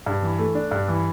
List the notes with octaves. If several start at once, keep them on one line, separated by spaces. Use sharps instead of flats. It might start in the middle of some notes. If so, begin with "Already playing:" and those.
G2
E3
A3
D4
G2
E3